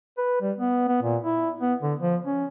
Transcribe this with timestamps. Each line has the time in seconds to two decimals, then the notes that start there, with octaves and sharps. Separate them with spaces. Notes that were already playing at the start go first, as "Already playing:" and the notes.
0.18 B4
0.41 G3
0.58 B3
0.88 B3
1.03 A#2
1.23 E4
1.61 B3
1.83 D3
2.01 F3
2.26 C#4